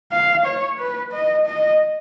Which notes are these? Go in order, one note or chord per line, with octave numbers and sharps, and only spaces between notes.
F5
C#5
B4
D#5
D#5